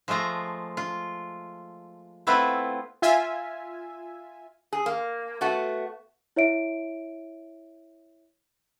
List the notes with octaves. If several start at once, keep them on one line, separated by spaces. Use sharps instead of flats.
F3 G#3 A3 F4 A#5
F4
A3 B3 C4 E4 F4 B4
F4 E5 G#5
G#4
A#3
A3 B3 F#4
E4 C#5 E5 D7